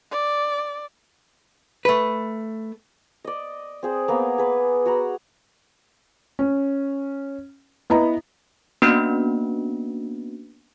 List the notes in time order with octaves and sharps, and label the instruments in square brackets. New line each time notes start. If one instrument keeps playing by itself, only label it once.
[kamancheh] D5
[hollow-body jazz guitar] A3 B4
[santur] D5 D#5
C4 G#4 C5
A#3 B3 A#4
G#4 B4
F#4 A#5 B5
[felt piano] C#4
B3 E4 D#5 A#5
[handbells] A#3 B3 C#4 D4 F#4 B4